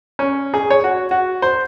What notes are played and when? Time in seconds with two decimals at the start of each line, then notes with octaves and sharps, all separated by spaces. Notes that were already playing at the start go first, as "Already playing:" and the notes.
0.19 C#4
0.54 G#4
0.70 C#5
0.84 F#4
1.11 F#4
1.42 C5